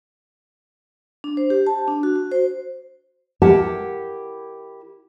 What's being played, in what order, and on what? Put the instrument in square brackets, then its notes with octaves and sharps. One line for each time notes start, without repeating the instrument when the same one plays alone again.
[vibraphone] D4
C5
G4
A5
D4
F#4
F#4
C5
[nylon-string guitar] E4 G4 A#4 F#5 A5